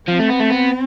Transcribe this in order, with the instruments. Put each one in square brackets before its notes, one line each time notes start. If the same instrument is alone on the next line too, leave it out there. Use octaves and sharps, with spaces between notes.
[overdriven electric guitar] F3 [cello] C4
[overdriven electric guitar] A3
B3
A3
B3